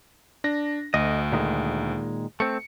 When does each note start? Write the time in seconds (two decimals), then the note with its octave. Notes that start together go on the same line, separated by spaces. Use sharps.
0.44 D4 A#6
0.94 D2 D#5
1.32 A#2 D#3 G#3
2.40 A3 C4 C#7